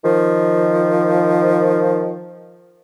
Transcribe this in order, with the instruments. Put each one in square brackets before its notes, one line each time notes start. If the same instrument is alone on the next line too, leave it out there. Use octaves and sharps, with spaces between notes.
[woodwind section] D#3 F3